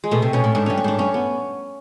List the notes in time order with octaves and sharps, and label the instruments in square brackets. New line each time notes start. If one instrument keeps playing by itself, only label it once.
[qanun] G#3
[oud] B2 [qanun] A3
[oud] C3
[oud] B2 [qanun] C#4
[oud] A2
[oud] G#2 [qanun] D4
[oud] G2 [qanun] C#4
[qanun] C#4
[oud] G#2 [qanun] D4
[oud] G2 [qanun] C#4
[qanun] B3